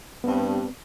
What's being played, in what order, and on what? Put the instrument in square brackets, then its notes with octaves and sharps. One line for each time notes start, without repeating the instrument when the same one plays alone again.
[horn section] G2 [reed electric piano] B3 C4